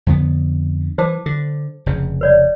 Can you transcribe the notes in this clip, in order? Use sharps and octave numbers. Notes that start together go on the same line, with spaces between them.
F2 D3 B3
E3 C5 A5 D6
D3
F1 C#3
B4 C#5 D5